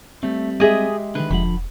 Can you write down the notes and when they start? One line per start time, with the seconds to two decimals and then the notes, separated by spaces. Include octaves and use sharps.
0.23 G3 A3 C4
0.60 G#3 G4 G#4 D#5 E5
1.15 D3 D#3 B4
1.31 E1 D3 F3 F#5 B5